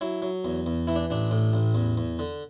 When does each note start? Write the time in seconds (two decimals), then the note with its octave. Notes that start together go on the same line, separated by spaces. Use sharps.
0.01 F#3 E4
0.22 F#3
0.44 E2
0.66 E2
0.87 E3 E4
0.96 D4
1.10 A1 D4
1.31 A2
1.53 A1
1.75 E2
1.97 E2
2.19 D3